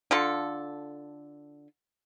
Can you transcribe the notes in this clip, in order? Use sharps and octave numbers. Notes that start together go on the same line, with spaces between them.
D3 F4 A4